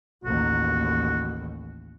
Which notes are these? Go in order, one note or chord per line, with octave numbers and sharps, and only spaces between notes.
A1 D#2 F#4